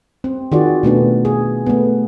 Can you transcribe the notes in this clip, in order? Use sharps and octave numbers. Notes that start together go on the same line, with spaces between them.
C4
D#3 F4 F#4 G#4 D5
B2 A3 B3 D4
G#4
A3 B3